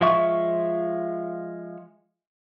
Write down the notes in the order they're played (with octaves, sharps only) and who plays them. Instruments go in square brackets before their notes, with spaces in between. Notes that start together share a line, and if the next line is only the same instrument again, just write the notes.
[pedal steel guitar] F3 G#3 E5 C#6